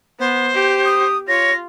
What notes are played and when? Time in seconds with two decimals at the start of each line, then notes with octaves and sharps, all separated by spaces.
0.19 B3 C5
0.54 G4
0.84 D#6
1.28 F4 C#5 A#6